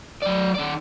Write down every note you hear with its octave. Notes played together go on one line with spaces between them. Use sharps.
F#3 D5
D#3 D5